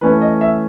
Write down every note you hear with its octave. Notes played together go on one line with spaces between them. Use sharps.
E3 A3 C#4 B4
D#5
E5